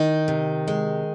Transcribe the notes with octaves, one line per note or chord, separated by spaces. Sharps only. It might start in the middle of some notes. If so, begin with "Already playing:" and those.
Already playing: D#3 D#4
C3
G#3